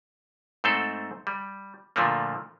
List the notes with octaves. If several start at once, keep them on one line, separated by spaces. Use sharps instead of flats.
G#2 A3 C4 A4 C5
G3
A#2 D3 F3 A3 A#3